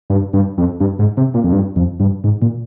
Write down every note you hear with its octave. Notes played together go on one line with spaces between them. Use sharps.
G2
G2
F2
G2
G#2
C3
A#2
F2
G2
F2
G2
G#2
A#2